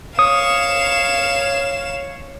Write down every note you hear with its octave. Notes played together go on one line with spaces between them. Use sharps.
C#5 F5 D#6 E7